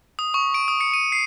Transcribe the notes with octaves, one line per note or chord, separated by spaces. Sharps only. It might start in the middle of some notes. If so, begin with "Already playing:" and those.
D#6
C#6
D7
D#6
C#7
D#7
C7